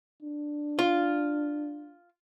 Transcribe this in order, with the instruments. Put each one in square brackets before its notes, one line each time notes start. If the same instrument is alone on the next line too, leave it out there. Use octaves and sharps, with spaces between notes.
[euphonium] D4
[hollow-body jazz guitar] F4